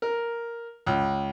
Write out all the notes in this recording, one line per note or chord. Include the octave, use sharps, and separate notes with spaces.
A#4
C#2